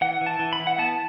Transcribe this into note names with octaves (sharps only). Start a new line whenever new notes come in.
E3 F#5
E3
A5
E3
B5
E3
F#5
B3 A5